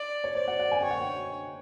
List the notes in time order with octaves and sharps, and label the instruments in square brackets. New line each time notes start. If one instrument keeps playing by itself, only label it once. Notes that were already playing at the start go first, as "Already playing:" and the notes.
Already playing: [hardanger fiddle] D5
[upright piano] C#5
[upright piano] C5 [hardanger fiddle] D5
[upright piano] F#5
F#5
G#5
[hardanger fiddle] C#5 [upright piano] G5
[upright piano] F#5
G5